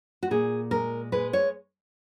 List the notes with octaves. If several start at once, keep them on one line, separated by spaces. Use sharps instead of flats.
F#4
A#2 G#4
G#3 A#4
G#3 B4
C#5